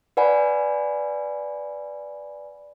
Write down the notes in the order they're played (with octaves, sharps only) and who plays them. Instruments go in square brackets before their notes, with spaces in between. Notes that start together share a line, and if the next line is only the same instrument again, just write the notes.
[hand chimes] B4 D5 F#5 G#5 B5